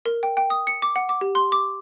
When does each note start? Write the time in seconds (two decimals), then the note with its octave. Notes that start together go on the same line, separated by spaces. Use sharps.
0.06 A#4
0.23 G5
0.37 G5
0.50 D#6
0.67 C#7
0.82 D6
0.96 F#5
1.09 D6
1.21 G4
1.35 C6
1.52 D6